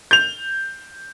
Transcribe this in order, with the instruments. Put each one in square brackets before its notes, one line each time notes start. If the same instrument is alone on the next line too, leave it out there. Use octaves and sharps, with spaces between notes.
[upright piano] G6 F7